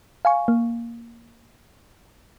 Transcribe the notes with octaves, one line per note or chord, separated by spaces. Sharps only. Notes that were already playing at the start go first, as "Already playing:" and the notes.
F5 G#5 C#6
A#3